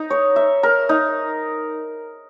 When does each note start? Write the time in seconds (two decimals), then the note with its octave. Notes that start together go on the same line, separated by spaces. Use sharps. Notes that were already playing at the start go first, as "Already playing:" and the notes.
Already playing: D#4
0.10 C#5
0.36 E5
0.63 A#4
0.89 D#4